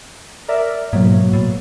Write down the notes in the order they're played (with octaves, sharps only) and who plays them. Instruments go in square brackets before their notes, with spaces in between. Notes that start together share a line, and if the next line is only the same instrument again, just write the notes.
[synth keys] A#4 D5 E5
[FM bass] G#2 [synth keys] B2 F#3 A#3
[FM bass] A2